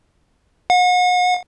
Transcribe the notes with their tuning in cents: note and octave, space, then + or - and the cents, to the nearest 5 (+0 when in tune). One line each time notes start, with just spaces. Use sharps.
F#5 -40